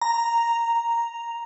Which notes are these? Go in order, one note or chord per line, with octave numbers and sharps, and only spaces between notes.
A#5